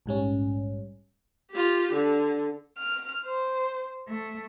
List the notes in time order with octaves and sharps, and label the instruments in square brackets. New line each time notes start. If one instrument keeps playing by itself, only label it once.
[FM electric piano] A#1 G#2 G3 C#4
[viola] F4 G4
D3
[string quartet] F6
C5
A3